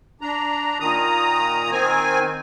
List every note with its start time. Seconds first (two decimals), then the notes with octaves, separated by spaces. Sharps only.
0.21 D4 A#5
0.80 A#2 D#3 A#5 D#6
1.72 D#3 C4 G#5